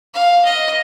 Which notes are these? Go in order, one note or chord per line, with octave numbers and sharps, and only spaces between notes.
F5
D#5